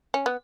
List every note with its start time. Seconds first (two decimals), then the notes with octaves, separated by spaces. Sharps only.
0.14 C#4
0.26 B3